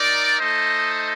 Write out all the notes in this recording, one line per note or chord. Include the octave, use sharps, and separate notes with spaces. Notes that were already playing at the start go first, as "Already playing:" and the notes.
Already playing: D#4 A#4 D5
A3 D#4 A4 C5 D#5